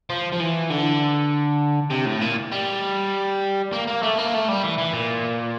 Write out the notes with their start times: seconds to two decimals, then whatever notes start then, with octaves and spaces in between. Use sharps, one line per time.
0.10 F3
0.32 F3
0.40 E3
0.70 D3
1.90 C3
2.05 A2
2.21 A#2
2.52 G3
3.73 A#3
3.87 A#3
4.02 A3
4.18 A#3
4.34 A3
4.48 G3
4.64 E3
4.78 E3
4.93 A#2